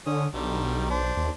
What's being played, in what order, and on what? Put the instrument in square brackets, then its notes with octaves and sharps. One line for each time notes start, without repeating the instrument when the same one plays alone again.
[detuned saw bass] D3 [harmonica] C#4 D#6
[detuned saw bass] B1 [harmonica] D3 D#3 G3
[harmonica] D4 C5
[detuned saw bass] D#2